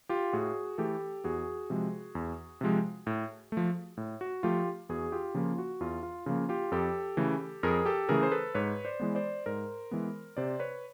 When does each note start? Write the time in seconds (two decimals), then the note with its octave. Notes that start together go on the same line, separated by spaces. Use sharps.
0.09 F4 G4
0.33 A2 F#4 G#4
0.78 E3 A3 G4 A4
1.24 E2 F#4 G#4
1.70 C3 F3 G#3
2.15 E2
2.61 C3 F3 G#3
3.07 A2
3.52 F3 A3
3.97 A2
4.21 F#4
4.43 F3 A3 F4 G4
4.89 E2 F#4 G#4
5.12 F4 G4
5.34 C#3 F3 A#3 F4
5.58 F#4
5.80 E2 F4
6.03 F4
6.26 C#3 F3 A#3 F4
6.49 F4 G4
6.72 F2 G4 A4
7.17 C#3 E3 A3
7.63 F2 G#4 A#4
7.85 G4 A4
8.09 C#3 E3 A3 G#4 A#4
8.23 C5
8.32 A4 B4
8.55 G#2 B4 C#5
8.85 C5 D5
9.00 E3 G#3 B3
9.15 C5 D5
9.46 G#2 A#4 C5
9.91 E3 G#3 B3
10.37 C3 C5 D5
10.60 B4 C#5